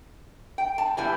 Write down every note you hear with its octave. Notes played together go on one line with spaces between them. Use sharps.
G5
A5
E3 G3 B3 E4 G#5